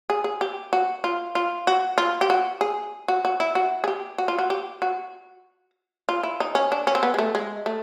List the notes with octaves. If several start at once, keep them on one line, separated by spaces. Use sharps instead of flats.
G#4
G#4
G4
F#4
F4
F4
F#4
F4
G4
F#4
G#4
F#4
F#4
E4
F#4
G#4
G4
F#4
F4
F#4
G4
F#4
F4
E4
D#4
C#4
D4
C#4
C4
B3
G#3
A3
G#3
A3